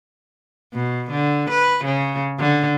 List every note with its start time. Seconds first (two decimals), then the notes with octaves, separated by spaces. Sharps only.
0.73 B2
1.11 D3
1.50 B4
1.85 C#3
2.39 D3